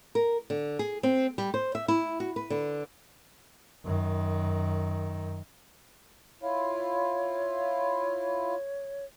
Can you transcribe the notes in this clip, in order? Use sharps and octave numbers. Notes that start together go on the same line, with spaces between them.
A#4
D3
G#4
C4
G3
C5
E5
E4
F#4
B4
D3
F#2 D#3
E4 F4 C#5